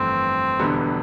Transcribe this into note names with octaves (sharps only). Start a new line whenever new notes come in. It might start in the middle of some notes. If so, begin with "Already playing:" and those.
Already playing: G1 F2 E3 A3 C4
E1 E2 D3 G3 B3